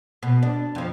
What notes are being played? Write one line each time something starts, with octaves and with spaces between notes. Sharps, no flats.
B2
D4
F2 F3